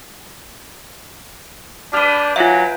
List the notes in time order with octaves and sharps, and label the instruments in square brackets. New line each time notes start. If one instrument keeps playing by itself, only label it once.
[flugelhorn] D4 [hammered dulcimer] G4 B4 [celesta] F6 F7 G7
[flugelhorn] F#3 [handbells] F4 E5 [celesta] F5 G#5